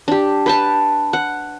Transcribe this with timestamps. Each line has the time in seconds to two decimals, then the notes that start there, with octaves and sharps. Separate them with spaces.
0.08 D4 G4
0.46 B4 G5 A5
1.13 F#5